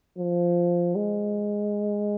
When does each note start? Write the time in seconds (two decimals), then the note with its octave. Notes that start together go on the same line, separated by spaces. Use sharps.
0.18 F3
0.96 G#3